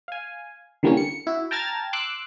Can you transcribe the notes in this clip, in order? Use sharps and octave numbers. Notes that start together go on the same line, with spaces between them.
F5 G#5
D3 E3 G3 A#3 B3 C#4
C#7
E4 F#4
G5 A5 A#5 F6 G#6 A6
C6 D6 E6 F#6